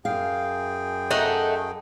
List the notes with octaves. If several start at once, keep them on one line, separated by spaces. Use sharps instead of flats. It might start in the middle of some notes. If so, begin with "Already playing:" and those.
F#2 G#4 F5 G5
A3 D#4 F#5